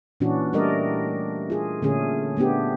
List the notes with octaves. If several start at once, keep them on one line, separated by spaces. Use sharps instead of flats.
A#2 E3 C#4 D4 F#4
G3 A3 D4 A#4 D5 D#5
F4 G#4
A#2 D3 A3 C#4 G#4
A3 B3 D4 G4